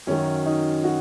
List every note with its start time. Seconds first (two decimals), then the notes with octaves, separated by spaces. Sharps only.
0.07 F#2 D#3 F#3 C#4
0.45 D#4
0.84 F#4